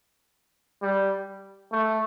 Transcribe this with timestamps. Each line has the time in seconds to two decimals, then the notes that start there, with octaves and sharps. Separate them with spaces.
0.82 G3
1.72 A3